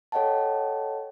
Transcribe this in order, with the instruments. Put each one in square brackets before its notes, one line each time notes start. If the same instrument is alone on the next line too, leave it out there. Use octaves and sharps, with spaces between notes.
[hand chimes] A4 C#5 D#5 F#5 G5 A5